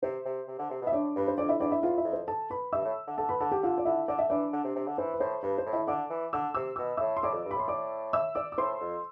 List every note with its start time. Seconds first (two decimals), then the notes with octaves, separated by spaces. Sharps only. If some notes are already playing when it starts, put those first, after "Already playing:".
0.03 C3 C5
0.25 C3
0.48 C3
0.59 D3
0.70 C3
0.82 B2
0.87 E5
0.93 A2 D4 D5
1.16 G2 B4
1.28 C5
1.38 F2 D4 D5
1.49 E4 E5
1.60 E2 D4 D5
1.71 E4 E5
1.83 E2 F4 F5
1.98 E4 E5
2.05 F2
2.13 C5
2.28 A4 A5
2.50 B4 B5
2.73 G2 E5 E6
2.85 A2
3.07 D3
3.18 D3 A4 A5
3.29 B4 B5
3.41 D3 A4 A5
3.51 G4 G5
3.63 D3 F4 F5
3.78 D5
3.85 D3 E4 E5
4.08 D3 D5
4.19 E5
4.30 E3 D4 D5
4.53 D3
4.64 C3
4.76 C3
4.87 D3
4.98 E3 C5
5.14 B4
5.20 A2 C5
5.43 G2 B4
5.58 C5
5.66 A2
5.73 E4 E5
5.87 D3 D5 D6
6.10 E3
6.33 D3 E6
6.54 C3 E6
6.76 B2 E6
6.97 A2 E5 E6
7.17 C6
7.23 A2 D5 D6
7.34 F2
7.45 G2
7.51 B5
7.56 A2 C6
7.68 D5 D6
8.13 E5 E6
8.35 D5 D6
8.52 D6
8.58 A2 C5 C6
8.81 F2